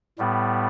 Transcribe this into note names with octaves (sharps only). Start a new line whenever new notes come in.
A2 G3 B3